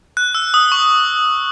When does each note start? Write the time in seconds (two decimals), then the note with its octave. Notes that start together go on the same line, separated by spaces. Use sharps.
0.17 F#6
0.35 E6
0.54 D#6
0.72 C#6